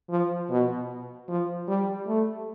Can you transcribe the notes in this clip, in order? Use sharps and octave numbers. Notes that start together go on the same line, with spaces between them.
F3
B2
F3
G3
A3